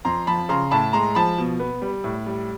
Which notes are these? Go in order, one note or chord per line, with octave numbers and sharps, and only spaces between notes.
F2 A#5 C6
F3 A5 B5
C#3 A#5 C6
A2 A5 B5
G#3 A#5 C6
F3 A5 B5
B2
B3
G3
A2
G3